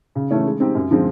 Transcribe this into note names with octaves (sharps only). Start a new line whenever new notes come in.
C#3
E3 A3 C#4
G#3
C4 D#4 G4
F#2
D3 F3 G#3 C4